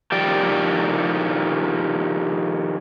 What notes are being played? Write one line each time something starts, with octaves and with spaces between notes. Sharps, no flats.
D#3 F3 G4 D5 G5